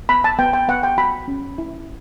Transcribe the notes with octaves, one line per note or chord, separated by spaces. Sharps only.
B3 B5
A5
B3 G5
G5
B3 F#5
G5
F#4 B5
C#4
E4